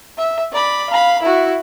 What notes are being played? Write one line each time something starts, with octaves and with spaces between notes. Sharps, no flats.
E5
D5 B5
F5 B5
E4 F#4